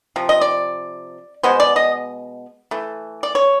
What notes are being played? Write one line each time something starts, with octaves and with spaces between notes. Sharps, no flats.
C3 F3
D#5
D5
B2 G#3 B3 C5
D5
D#5
E3 A3
D5
C#5